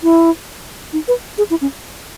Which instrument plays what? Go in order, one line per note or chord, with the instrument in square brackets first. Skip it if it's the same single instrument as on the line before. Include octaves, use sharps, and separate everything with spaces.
[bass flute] E4
D#4
B4
G#4
E4
C#4